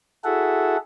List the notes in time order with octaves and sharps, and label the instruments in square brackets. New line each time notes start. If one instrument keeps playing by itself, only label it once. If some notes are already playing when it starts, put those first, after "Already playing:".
[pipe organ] E4 F#4 G#4 A4 E5 F#5